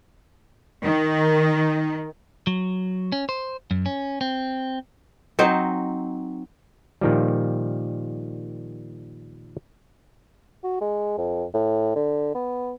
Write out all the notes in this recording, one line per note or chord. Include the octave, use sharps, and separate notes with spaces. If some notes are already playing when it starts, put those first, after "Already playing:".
D#3
F#3
C#4
C5
F#2
C#4
C4
F#3 C4 D#4
A#2 D#3 F3 G3
F#4
G#3
F2
A2
D3
B3